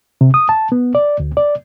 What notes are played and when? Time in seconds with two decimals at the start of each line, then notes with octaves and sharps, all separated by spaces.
0.21 C3
0.34 D#6
0.49 A5
0.72 B3
0.95 D5
1.20 D2
1.37 D5